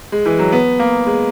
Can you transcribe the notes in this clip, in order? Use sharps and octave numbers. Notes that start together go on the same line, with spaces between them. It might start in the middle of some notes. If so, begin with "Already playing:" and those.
G#3
E3
F#3
B3
A#3
G#3